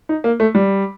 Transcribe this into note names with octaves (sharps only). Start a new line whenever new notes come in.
D#4
A#3
A3
G3